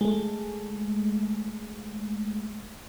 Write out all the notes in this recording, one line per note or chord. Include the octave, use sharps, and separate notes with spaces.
G#3 A3